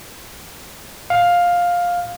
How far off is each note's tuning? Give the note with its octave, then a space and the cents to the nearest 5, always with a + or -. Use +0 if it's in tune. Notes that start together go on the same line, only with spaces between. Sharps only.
F5 +10